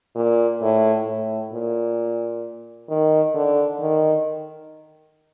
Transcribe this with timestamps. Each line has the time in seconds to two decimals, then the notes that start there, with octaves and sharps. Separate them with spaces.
0.15 A#2
0.61 A2
1.06 A2
1.53 A#2
2.89 D#3
3.35 D3
3.81 D#3